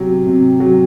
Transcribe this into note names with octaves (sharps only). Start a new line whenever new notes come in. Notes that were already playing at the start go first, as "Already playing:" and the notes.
Already playing: C3 F#3 G4
C3
F#3